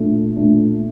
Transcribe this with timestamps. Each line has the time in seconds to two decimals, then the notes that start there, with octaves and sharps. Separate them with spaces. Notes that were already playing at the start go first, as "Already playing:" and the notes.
Already playing: A#2 A3 D4
0.37 A#2 A3 D4